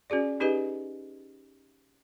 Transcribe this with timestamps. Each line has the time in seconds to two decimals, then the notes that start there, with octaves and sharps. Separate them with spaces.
0.10 C#4 F#4 G#4 D5
0.40 C#4 D#4 G4 G#4 B4 D#5